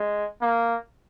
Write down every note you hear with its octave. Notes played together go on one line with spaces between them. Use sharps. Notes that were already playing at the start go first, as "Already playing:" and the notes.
Already playing: G#3
A#3